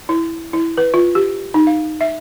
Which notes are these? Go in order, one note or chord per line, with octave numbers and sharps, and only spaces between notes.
E4
E4
B4
F4
G4
D#4
F5
E5